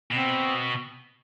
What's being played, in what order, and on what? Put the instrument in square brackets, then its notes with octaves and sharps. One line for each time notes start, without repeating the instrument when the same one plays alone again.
[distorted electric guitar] B2 [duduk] C4